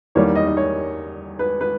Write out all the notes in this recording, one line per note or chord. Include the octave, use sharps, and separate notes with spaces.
E2 D#3 G3 A#3 C#5
D#5
D#5
C#5
B4
B4